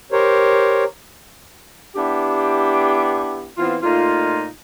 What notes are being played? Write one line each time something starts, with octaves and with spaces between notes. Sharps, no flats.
G4 A#4 C5 C#5
B3 D4 E4 G4
E3 B3 C4 F4
A#2 A3 D#4 F4